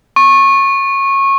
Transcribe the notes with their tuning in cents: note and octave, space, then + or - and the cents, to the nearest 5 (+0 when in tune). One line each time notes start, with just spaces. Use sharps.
C#6 -20